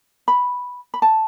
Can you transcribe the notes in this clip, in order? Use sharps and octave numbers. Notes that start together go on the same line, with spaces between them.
B5
B5
A5